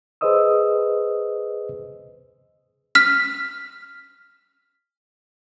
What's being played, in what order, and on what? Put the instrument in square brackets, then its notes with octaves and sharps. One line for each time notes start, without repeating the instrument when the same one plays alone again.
[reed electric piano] G#4 B4 C5 D#5 D#6 E6
[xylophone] F6 B6